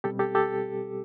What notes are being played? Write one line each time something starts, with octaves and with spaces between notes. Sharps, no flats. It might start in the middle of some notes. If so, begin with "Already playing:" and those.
B2 G3 C4 G4 A4
G4 A4
G4 A4